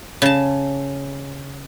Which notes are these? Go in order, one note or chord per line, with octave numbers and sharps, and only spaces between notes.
C#3 A5